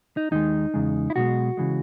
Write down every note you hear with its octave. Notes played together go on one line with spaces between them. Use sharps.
D#4
D#2 D#3 G#3 D#4
E2 C#3 G#3
E4
B1 B2 G#3 F#4
C#3 E3 G#3